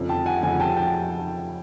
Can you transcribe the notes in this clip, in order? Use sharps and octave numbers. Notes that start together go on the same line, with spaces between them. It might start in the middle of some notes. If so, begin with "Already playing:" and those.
Already playing: F2 C#3 F3
G5 A5
F#5 G#5
F2 C#3 F3 F#5 G#5
G5 A5
G5 A5